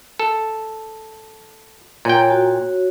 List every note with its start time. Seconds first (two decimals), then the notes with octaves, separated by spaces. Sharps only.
0.19 A4
2.05 A#2 C#5 G5 G#5 A#5
2.30 F#4 C#5